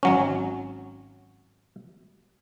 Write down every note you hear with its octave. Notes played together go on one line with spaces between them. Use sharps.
G#1 F#3 C#4